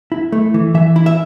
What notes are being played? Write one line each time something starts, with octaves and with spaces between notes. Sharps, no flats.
E4
A3
E3
E3 E5
E4
E5